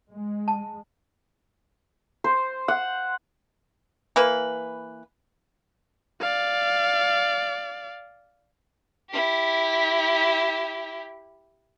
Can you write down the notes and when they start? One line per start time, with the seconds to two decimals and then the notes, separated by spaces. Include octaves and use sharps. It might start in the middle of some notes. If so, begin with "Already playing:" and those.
0.10 G#3
0.48 A5
2.24 C5
2.68 F#5
4.16 E3 A#3 B4
6.20 D5 F5
9.11 E4 G4